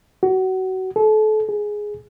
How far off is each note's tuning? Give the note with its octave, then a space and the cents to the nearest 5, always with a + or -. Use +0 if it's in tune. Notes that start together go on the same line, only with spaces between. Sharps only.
F#4 +25
A4 -35
G#4 +5